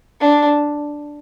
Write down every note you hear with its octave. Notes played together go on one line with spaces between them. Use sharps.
D4